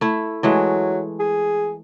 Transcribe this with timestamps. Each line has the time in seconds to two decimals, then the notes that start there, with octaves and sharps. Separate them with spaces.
0.01 A3 E4
0.43 E3 F#3 G#3 A3
1.19 G#4